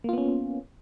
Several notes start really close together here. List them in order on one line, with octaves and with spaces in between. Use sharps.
A#3 F4 B3 C#4